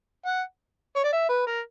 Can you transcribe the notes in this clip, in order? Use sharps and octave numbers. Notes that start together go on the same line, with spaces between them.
F#5
C#5
D5
E5
B4
A#4